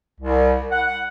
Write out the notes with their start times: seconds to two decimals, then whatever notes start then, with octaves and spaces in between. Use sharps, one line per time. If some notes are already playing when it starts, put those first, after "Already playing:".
0.19 C2
0.70 F#5